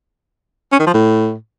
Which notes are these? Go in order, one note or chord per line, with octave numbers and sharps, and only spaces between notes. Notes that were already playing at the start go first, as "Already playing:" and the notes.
C#4
D#3
F3
A2